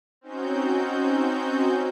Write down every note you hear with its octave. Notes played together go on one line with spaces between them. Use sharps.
C4 C#4 D#4 F#4 G6